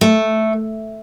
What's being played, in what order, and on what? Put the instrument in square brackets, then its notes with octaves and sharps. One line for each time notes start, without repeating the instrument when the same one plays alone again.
[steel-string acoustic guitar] A3